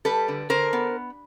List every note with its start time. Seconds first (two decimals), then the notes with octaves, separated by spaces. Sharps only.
0.05 G3 A4 B4
0.28 D3
0.50 D3 A#4 C5
0.73 B3